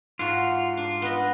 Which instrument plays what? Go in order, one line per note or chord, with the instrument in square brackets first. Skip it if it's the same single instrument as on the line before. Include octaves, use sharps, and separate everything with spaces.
[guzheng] G#2 F#4 [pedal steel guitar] F4
[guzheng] D4
B3 B4 D#5